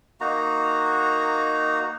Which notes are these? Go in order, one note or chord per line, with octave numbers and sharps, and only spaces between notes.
A#3 D#4 F#4 A#5